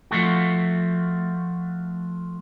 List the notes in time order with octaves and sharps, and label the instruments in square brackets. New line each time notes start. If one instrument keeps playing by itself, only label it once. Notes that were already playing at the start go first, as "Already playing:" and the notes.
[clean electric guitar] F3 A3 F#4